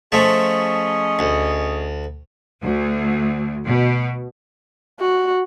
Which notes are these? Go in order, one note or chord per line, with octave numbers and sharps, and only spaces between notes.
F3 A3 C#4 G#4 D#5
D2
D2
B2
F#4